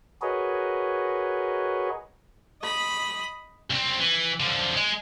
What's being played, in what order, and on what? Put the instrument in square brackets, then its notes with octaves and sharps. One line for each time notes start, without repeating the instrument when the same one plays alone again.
[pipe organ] F#4 G#4 A#4 B4 C#5 D#5
[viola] D#5 B5
[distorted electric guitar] C2 C4
E3
D3 F3
G#3